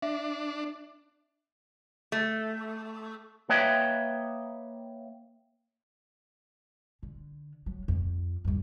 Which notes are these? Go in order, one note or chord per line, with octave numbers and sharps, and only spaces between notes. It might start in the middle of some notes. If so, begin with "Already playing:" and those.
D4 E5
A3
A#3 B4 C#5 D#5 E5 G5
D3
F#3
F2
E2 G2